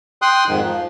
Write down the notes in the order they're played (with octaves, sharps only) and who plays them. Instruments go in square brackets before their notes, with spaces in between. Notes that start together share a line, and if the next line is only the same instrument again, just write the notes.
[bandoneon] G5 C6 D#6 F#6
F2 G#2 D#3
F3